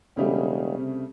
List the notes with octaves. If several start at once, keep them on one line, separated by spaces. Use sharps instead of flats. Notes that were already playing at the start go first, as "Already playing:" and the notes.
E1 C#3 G3 A3
C3